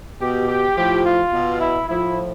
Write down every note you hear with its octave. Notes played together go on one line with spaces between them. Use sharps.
B2 G4
G4
A2 F3 G4
F4
B2
E4
A2 F3 E4